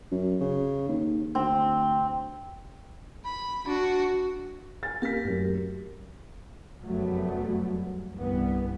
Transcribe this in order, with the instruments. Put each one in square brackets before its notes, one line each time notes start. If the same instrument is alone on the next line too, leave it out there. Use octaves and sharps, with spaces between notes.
[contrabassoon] F#2
C#3
D#2
[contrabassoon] D2 [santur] C4
[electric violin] B5
D4 F#4
[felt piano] G#5 A6
[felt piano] A#3 B6 [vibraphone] G4 A#4
[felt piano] A1 F#2
[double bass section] F1 F#2 F#3 G3 A3 B3
C2 G2 E3 G3 B3